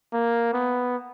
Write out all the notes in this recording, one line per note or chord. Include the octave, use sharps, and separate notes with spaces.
A#3
B3